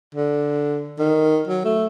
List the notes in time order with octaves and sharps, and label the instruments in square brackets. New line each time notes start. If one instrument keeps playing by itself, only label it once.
[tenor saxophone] D3
D#3
F#3
A3